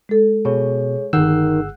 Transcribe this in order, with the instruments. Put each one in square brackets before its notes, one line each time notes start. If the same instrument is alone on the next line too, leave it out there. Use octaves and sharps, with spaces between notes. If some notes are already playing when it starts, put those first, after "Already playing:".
[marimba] G#3 A4
[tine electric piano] B2 [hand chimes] G#4 C#5
[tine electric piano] G1 G#4 E6 [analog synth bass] D#3 [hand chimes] F#5 F#6 G6